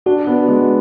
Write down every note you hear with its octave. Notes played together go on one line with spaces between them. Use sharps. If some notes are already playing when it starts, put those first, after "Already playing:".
D4 F#4
B3
G#3